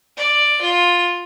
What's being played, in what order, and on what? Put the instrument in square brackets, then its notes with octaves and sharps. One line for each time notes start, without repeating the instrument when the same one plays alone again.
[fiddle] D5
F4